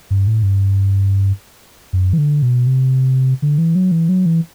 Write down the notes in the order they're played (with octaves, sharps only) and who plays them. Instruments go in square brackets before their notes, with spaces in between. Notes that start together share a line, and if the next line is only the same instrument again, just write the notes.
[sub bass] G2
A2
G2
F#2
E3
D3
B2
C3
D3
E3
F#3
E3
F#3
E3